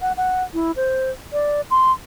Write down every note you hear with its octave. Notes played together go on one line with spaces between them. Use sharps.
F#5
F#5
E4
C5
D5
C6